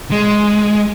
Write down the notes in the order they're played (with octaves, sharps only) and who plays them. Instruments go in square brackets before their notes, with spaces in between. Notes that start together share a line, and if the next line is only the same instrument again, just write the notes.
[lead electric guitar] G#3